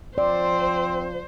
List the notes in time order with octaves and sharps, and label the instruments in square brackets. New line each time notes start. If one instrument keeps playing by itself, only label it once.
[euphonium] F3 [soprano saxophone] C4 [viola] C5 [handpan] D5